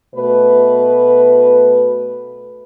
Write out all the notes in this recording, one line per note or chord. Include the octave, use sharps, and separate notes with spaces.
B2 A3 B4